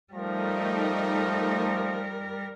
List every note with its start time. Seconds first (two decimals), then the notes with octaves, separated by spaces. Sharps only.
0.13 F3 G3 A3 D#4 A#4